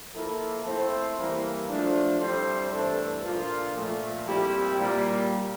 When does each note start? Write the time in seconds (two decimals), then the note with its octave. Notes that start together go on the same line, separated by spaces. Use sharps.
0.13 F3 A#3 E4 A4
0.65 A3 C4 E4 A4 C5
1.17 E3 G3 A#3 E4
1.68 F3 A3 D4
2.20 G3 C4 E4 A4 C5
2.72 G2 E3 A3 D4 A4
3.24 A#2 F3 A#3 D4 F4
3.75 A#2 F3 A3
4.27 A#2 G3 C4 E4 G4
4.79 A#2 G3 A#3